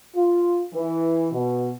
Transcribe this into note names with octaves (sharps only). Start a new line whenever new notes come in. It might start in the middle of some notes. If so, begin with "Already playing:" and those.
F4
E3
B2